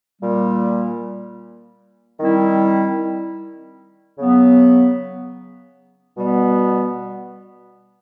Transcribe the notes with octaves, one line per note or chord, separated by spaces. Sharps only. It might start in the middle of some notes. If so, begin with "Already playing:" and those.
A#2 G3 A#3
D#3 G3 C4 E4
C#3 F#3 B3
B2 G3 B3